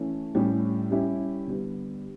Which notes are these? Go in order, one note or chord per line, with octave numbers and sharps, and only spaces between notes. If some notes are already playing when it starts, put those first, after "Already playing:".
Already playing: E3 A3 C#4
A2 G3 C#4 G4
G3 C#4 E4 G4
D3 G3 B3